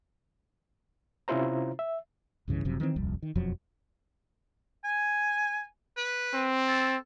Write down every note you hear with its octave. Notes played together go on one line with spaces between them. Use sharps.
C3 C#4 E4 F4 C5 A#5
E5
C2 G2 C#3 E3
F#1 F#2 C3 F3
D#3 E3 G3 C4
D#1 C2 F2 G3
D#3
E1 F2 F3 F#3
G#5
B4
C4
A4